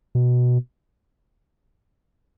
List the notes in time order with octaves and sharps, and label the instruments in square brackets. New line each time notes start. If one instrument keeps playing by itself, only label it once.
[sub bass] B2